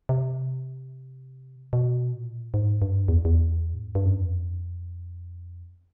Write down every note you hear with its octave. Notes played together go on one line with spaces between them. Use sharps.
C3
B2
A#2
G#2
G2
E2
E2
A2
G#2
G2
F#2
F2